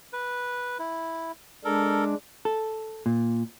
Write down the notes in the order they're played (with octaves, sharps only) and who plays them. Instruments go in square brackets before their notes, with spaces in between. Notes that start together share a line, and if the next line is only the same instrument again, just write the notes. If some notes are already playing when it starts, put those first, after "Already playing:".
[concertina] B4
E4
[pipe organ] G#3 D4 [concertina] A4 A#4
[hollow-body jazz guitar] A4
A#2